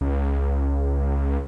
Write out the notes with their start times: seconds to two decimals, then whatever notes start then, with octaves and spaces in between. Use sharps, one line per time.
0.01 C#2